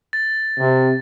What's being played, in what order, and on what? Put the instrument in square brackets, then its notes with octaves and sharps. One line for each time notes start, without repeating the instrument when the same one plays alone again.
[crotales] A6
[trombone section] C3